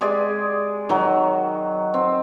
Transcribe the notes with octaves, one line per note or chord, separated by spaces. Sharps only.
G#3 G4 G#4 D5
D#3 F#3
C4